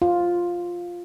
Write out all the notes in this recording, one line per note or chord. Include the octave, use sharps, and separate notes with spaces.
F4